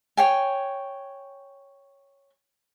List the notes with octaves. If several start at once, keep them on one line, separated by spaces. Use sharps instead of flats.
C#5 G5 G#5